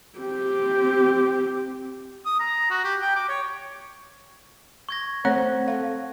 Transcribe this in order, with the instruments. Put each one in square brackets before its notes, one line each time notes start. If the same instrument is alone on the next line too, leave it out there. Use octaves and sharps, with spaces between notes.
[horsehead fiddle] C4 G4
[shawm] D#6
A#5
F#4
G4
G5
D6
C#5
[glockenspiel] C#6 G#6 A#6
[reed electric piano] A3 F#5 [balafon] C4 C#5 [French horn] C5
[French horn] A4 [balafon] F5